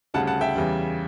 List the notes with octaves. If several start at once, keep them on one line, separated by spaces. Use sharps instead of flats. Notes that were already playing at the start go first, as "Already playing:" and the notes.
D2 C#3 G3 F#5 A5
F#5 A5
E5 G5
E2 C#3 G3